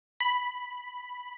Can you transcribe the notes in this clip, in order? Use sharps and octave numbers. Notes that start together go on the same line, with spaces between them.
B5